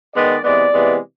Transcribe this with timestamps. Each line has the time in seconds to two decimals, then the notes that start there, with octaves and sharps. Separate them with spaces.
0.14 D#3 G#3 B3 D5
0.43 C3 E3 G#3 B3 D5
0.73 C3 E3 G#3 B3